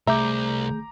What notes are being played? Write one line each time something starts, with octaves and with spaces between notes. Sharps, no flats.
C2 A3 G#4 E5 A#5 D6 G6